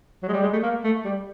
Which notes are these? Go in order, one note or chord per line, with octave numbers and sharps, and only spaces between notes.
F#3
G#3
G3
G#3
A3
A#3
A3
G3